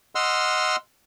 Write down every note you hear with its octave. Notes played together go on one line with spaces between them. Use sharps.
D#5 F#5 C6 E6 F6